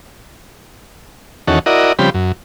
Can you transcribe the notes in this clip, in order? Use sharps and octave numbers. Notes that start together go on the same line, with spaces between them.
E2 D#3 C#4 F#4 A4
E4 F#4 A#4 D5 D#5
C#3 F3 G3 C4 G4 B5
F#2